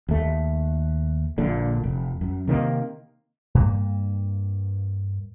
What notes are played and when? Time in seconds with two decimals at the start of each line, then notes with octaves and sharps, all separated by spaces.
0.09 D#2 A3
1.38 A#1 A#2 D3
1.83 F1
2.21 F#2
2.48 C3 D#3 F#3 A#3
3.55 G2 A#3